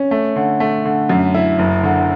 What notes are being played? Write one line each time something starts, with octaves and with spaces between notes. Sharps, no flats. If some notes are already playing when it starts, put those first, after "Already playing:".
Already playing: C#4
A3
D3
A3
D3
F#2
E4
F#1
D3